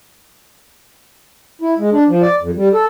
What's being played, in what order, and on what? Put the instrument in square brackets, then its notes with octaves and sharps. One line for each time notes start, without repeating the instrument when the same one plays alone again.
[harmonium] E4
G#3
D4
F3
D5
F2
G3
A4